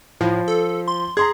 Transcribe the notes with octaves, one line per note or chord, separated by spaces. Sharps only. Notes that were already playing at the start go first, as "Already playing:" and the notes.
A2 F3
A4
C6
G#4 A#5 C6 G#6